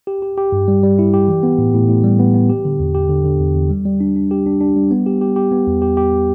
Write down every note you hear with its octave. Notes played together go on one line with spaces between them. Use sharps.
G4
G4
G4
G2
G3
G3
E4
G4
E3
B3
A2
A2
A2
G3
B3
B3
G4
D3
E2
G4
D3
D3
E2
E2
G3
G3
D4
D4
G4
D4
D4
G3
B3
G4
G4
G4
B3
E2
G4
G4